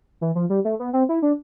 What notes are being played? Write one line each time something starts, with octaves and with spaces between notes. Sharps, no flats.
E3
F3
G3
A3
B3
C4
E4
D4